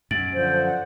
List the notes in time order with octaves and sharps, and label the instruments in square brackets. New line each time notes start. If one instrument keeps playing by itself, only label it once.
[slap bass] F#2 [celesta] A6 D7 F#7
[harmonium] D3 F3 [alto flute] C5
[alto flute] F#5